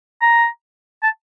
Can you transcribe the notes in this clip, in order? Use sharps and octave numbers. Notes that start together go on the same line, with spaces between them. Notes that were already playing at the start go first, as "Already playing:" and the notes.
A#5
A5